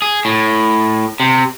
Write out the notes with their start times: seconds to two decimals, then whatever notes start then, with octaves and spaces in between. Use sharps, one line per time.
0.02 G#4
0.25 A2
1.20 C3